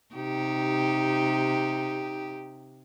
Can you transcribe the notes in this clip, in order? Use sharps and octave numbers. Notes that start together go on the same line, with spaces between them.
C3 D#4 G4